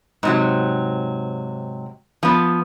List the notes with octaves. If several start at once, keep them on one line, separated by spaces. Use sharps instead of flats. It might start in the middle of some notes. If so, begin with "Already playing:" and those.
G#2 C3 F#3
F3 B3